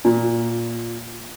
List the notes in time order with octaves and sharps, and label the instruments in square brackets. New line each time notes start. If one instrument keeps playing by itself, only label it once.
[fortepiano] A#2